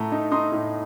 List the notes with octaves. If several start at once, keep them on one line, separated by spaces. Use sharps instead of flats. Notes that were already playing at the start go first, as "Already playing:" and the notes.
Already playing: A2 A3 A#5
D#4
D#4 C6 D#6
A2